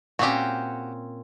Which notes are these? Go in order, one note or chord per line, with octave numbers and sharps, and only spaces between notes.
A#2 C4 C#4 F#4 G4